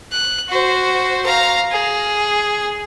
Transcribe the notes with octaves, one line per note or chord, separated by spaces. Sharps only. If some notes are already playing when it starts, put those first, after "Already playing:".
F#6
F#4 C5
F5 A#5
G#4